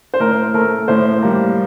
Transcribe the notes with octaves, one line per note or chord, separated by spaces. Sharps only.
C5
A2 A#4
A3 A#4
A2 C5
G3 A#3